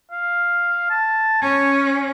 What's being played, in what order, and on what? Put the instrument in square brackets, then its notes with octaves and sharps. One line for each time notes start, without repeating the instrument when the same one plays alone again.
[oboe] F5
A5
[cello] C#4 [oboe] G#5